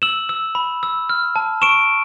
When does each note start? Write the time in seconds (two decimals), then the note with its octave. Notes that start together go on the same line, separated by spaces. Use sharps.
0.02 E6 E7 F#7
0.29 E6
0.55 B5
0.83 E6
1.09 F6
1.36 A5
1.62 C#6 D7 E7